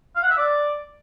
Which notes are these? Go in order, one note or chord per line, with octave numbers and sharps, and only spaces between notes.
F5
F#5
E5
D5